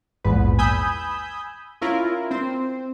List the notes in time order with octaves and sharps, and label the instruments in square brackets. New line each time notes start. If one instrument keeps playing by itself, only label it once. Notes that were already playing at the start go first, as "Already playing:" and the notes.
[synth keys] A#1 E2 G#2 B4
G#5 B5 D#6 E6 G6
C#4 E4 F4 A#4
C4 C5